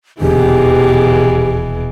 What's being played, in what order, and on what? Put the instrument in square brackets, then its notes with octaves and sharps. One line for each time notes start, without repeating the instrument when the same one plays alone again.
[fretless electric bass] D#1 E2 D3 [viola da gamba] B2 E3 [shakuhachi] G4 [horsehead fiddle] G#4